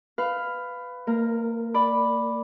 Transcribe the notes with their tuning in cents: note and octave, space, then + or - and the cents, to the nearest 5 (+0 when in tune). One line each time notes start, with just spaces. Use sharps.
B4 +15 F5 +0
A#3 -30 A#4 +0
D5 +0 B5 +0